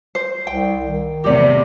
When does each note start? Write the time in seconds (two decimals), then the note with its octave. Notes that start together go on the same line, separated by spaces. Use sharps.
0.15 C5
0.47 C2 G5
0.85 D#3
1.24 E2 A2 C3 G4 D5